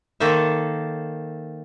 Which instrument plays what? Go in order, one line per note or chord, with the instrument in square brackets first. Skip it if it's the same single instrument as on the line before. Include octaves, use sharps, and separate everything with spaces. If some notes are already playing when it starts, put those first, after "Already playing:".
[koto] D#3 A#3 A4 C5 E5